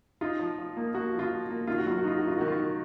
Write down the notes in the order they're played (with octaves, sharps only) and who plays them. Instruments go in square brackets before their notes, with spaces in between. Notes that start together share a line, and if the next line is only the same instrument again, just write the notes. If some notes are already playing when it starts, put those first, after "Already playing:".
[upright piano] D#4 [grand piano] F4
[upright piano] F3
F3
A#3
[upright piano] A#3 [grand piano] F#4
[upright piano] F3
[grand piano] F4
[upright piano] F3
A#3
[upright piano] D#3 [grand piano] F4
[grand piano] F#4
[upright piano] F#3 [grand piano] F4
[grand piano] F#4
[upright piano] D#4 [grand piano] F4
[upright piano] D#4 [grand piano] F#4
[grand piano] F4
[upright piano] D#3 [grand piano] F#4
[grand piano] F4
[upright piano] D#3